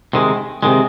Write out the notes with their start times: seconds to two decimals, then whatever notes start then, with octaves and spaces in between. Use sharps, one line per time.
0.13 C3 D#3 G#3
0.63 C3 D#3 G#3